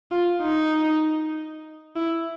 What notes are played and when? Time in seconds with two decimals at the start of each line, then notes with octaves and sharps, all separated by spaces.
0.11 F4
0.42 D#4
1.96 E4